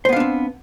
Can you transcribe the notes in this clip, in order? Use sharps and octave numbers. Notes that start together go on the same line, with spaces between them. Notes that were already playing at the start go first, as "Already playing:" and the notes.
B3 C4 D4 C5 F5